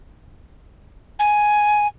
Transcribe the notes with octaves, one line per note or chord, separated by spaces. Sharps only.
G#5